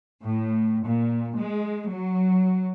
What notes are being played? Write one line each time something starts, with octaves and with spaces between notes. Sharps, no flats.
A2
A#2
G#3
F#3